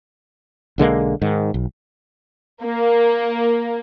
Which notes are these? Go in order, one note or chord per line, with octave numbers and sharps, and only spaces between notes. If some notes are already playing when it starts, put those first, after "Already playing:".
B1 D3 G#3 A#3
G#2 D#3
B1
A#3